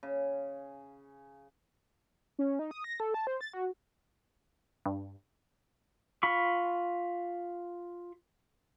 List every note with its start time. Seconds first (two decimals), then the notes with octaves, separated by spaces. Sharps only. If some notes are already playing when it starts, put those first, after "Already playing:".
0.03 C#3
2.39 C#4
2.59 D#4
2.71 D#6
2.84 A#6
3.00 A4
3.14 A5
3.27 C5
3.41 A6
3.53 F#4
4.86 G2
6.23 F4 B5 C#6